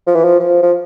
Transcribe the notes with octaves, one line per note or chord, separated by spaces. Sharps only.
F3
E3
F3
F3
F3